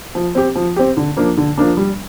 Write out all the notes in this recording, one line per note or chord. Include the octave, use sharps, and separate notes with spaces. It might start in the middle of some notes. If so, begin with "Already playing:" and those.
F3
C4 G4
F3
C4 G4
D3
F3 A#3 D4
D3
F3 A#3 D4
G3